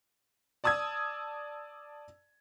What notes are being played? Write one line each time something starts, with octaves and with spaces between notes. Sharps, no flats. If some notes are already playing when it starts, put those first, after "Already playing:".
D5 A5 D#6 E6 G#6